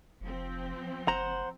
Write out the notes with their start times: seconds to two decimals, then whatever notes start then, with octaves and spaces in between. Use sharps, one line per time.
0.21 F1 F3 C4
1.08 F#1 C5 F#5 A#5